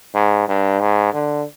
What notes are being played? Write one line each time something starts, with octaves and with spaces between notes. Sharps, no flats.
G#2
G2
G#2
D3